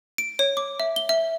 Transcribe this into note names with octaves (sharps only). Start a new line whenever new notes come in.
D7
C#5
D6
E5
G7
E5